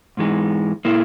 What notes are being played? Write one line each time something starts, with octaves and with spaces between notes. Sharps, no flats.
G#2 E3 G#3 D#4
A#2 A#3 E4